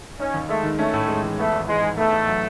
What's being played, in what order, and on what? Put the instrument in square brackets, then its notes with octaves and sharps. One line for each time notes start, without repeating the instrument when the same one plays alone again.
[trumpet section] C#4 [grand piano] D#4
[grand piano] D#2
[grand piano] G#3 [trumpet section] A3
[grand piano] D#3
[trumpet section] A3 [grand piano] C#4
[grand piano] A2
G#3
E3
[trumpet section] A3 [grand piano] B3
[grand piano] G#1
[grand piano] E3 [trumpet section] G#3
[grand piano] G#2
[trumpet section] A3 [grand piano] B3
[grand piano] A1
F#3